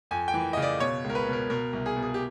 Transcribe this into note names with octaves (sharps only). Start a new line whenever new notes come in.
F2 G#5
G5
E3
C#3 D#5
D5
B2 C#5
C#2
A#4
B4
B2
A#4
B2 A#4
C2
G#4
B2
G#4
G4